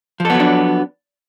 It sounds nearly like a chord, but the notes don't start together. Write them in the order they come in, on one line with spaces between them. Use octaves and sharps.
F3 A4 B3 F#3 D4